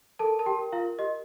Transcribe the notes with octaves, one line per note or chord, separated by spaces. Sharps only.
A4 A#4 A5
A#4 A5
G4 G5
A#4
F4 F5
A#4
G4 D#5